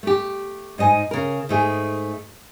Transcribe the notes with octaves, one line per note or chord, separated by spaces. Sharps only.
A3 G4
G#2 D#4 D#5 G#5
C#3 A#4
G#2 A3 G#4